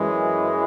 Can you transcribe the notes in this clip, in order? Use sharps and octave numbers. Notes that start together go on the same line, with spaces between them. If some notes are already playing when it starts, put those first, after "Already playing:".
Already playing: F#2 E3 G#3